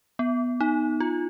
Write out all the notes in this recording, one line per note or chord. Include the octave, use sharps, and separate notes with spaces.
B3
D#4
F4